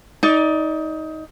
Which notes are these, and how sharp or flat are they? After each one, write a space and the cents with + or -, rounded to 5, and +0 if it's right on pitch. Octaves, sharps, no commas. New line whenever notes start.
D#4 +20 D5 +0